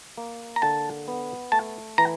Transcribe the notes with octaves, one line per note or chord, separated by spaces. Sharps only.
A#3
A#5
D3 A5
B3
A3 A5
E3 A#5